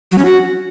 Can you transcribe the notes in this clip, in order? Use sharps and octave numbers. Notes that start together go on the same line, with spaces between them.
F#3
C#4
F#4